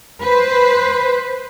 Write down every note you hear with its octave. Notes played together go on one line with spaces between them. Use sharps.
B4 C5